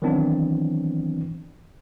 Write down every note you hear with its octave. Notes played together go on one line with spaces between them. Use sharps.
D#3 E3 F#3 B3 C4 D4